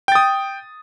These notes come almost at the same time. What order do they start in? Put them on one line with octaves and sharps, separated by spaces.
G5 A6 D#6